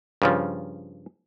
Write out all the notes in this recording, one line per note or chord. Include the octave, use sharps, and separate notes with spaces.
G2 C#3 F3